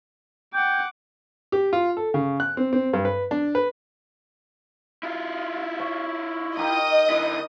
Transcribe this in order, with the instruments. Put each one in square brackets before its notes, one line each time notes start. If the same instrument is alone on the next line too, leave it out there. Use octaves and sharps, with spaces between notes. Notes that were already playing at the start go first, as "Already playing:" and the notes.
[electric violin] F#5 D6 [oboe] G5
[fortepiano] G4
F4
A4
C#3
F#6
C4
C4
G2
B4
D4
B4
[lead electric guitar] E4 F4
[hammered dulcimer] C#5
[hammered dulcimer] D#4 G4 A#4 [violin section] D#5 D#6
[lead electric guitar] D3 E4